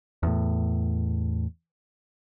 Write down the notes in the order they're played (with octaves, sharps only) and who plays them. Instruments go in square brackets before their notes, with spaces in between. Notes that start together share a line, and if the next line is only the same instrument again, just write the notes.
[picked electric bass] E2 A2